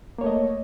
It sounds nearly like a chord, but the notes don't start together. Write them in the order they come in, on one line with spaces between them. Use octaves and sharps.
A#3 C#5 A3 D#5